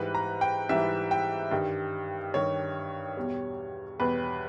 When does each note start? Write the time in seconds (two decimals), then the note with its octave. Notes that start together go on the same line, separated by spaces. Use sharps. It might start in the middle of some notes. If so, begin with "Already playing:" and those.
Already playing: G#2 E3 G3 B4
0.15 A#5
0.41 G5
0.69 G#2 E3 G3 E5
1.11 G5
1.51 G2 D#3 G3
2.34 G2 D#3 G3 C#5
3.17 E2 B2 G3
3.99 E2 B2 G3 B4